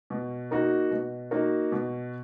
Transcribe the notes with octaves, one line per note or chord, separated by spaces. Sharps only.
B2
A#3 D#4 F#4
B2
A#3 D#4 F#4
B2